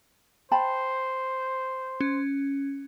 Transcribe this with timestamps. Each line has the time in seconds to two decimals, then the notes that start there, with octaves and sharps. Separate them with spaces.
0.51 C5 G5 A5 B5
2.01 C#4